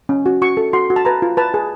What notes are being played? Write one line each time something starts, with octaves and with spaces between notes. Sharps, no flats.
C#4
F#4
F#4 C#6
A4
F#4 C6
F#4
A5
B4 A#5
F4
B4 A5
G#4